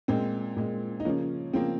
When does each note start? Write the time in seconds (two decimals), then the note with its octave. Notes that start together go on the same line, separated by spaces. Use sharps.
0.08 A#2 G#3 C4
0.57 A#2 G#3
1.00 D#4
1.05 C#3 F3 A#3 C#4
1.53 C#3 F3 A#3 C4